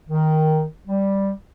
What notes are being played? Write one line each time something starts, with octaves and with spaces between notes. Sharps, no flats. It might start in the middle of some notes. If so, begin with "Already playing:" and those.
D#3
G3